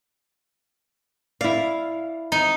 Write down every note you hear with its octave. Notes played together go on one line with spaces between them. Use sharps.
E4 D5 F5
D#4